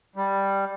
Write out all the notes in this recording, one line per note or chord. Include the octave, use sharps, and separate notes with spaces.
G3